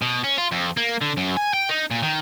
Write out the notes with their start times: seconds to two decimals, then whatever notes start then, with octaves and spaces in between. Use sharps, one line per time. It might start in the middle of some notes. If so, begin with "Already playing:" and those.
0.02 B2
0.24 C#4
0.38 F4
0.52 F2
0.77 A#3
1.01 D3
1.17 F#2
1.37 G#5
1.53 G5
1.69 D#4
1.91 A#2
2.03 D#3